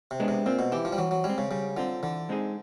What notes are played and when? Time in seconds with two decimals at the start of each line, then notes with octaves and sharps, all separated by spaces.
0.11 C3
0.20 G#3 B3 D4
0.28 C3
0.46 A#2 C4
0.59 B2
0.72 E3 E4 G4
0.85 F3
0.93 G3
0.98 E3 F#3
1.11 F#3
1.24 G3 G#3
1.29 C4
1.38 C#3
1.51 C#3 G3
1.77 D3 C4 F4
2.03 D3 E3
2.29 G#3 C4 D#4 G#4